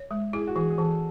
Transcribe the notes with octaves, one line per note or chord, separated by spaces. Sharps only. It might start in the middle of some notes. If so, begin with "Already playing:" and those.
Already playing: C#5
G#3
E4 G#4
F#4
E3 G#4
G#4
E3 A4